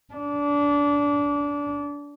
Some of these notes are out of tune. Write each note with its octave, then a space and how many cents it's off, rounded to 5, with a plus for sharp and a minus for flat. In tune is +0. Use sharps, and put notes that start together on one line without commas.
D4 -25